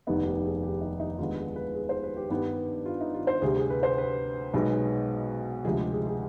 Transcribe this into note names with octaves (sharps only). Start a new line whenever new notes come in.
F1 D#2 D#3 G3 B3 D#4
G4
G#4
G4
D#4
D#4
D#2 D3 G#3 B3 F4
G#4
B4
G#4
C5
B4
G4
G2 D#3 G3 B3
F4
D#4
F4
C5
D2 C3 G3 G#4
G#4
B4
C5
B4
B1 B2 G#3 B3
D2 C3 F3 G#3 G#4
G4
G#4
G#4